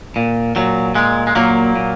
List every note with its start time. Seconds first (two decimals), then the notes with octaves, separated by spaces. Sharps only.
0.16 A#2
0.56 A#2 F#3
0.95 A#2 G#3
1.27 G#3
1.35 A#2 F#3 A#3
1.76 A#2